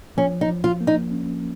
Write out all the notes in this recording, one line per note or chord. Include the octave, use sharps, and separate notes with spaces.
F3 C#4
D#4
F3
F4
A#3
D#4
C#4